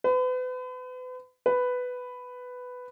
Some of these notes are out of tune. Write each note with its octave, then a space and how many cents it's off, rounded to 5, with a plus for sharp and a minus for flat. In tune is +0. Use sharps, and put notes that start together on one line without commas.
B4 +40
B4 +10